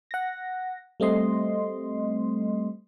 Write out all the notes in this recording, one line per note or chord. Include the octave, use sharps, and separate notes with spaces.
F#5 A#6
G3 A3 C4 D#5 C6